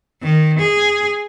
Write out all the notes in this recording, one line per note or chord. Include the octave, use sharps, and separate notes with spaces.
D#3
G#4